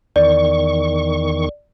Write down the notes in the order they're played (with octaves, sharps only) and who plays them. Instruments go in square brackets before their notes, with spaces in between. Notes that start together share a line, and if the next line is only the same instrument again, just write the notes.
[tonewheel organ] E2 D#3 C#6 [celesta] D5